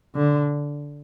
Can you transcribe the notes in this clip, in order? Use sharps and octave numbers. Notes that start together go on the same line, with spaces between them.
D3